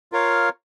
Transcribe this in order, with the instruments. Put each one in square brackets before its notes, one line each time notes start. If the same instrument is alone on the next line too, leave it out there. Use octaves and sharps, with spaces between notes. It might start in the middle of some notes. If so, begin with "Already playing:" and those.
[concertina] F4 A#4 C#5 F5